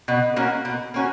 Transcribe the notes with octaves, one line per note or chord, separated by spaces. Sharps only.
B2
A#3 C#4 F#4
B2
A#3 C#4 F#4